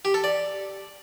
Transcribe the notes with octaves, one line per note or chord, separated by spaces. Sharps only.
G4
A4
D5